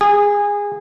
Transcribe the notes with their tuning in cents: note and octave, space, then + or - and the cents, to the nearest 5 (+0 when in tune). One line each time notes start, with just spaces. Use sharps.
G#4 -20